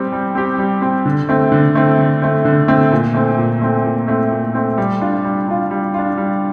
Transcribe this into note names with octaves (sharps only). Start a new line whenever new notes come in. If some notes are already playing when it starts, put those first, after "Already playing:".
Already playing: G3 C4 G4
G3
C4 G4
G3
C4 G4
D3
A3 C4
D3
A3 C4
D3
A3 C4
D3
A3 C4
A#2
A3 C4
A#2
A3 C4
A#2
A3 C4
A#2
A3 C4
G3
D4 F4
G3
D4 F4
G3
D4 F4
G3